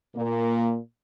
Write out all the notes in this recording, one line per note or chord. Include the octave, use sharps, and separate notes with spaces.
A#2 A#3